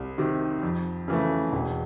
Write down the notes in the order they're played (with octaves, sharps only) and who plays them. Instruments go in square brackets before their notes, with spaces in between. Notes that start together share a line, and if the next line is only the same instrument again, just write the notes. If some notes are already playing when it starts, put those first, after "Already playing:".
Already playing: [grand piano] C2
C3 D#3
F2
C#3 E3 A3
E1